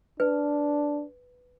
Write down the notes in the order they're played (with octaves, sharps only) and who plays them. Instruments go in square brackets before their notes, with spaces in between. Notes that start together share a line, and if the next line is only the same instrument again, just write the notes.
[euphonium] D4 [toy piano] B4